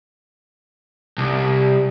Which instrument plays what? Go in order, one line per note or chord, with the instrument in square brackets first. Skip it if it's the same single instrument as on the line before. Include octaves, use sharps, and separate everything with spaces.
[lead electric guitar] C2